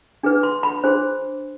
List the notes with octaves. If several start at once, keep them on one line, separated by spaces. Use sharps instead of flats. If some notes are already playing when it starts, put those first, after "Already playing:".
D4 G#4 B4
C6
B5
D4 G#4 C5 C6